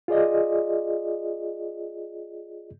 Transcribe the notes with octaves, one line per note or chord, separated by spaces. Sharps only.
F4 G#4 D5 D#5